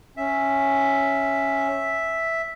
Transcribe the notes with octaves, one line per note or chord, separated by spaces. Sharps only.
C#4 E5